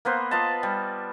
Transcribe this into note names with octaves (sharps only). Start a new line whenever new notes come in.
A#3 B3 B4 C5
F4 B4 D#5 A5
G3